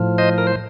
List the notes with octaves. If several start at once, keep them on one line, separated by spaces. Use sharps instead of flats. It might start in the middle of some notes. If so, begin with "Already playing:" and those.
Already playing: A2 F3
C5 D#5
A#4
C5